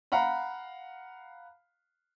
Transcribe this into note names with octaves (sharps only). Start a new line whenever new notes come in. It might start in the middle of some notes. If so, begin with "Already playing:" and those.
F5 F#5 A#5 B5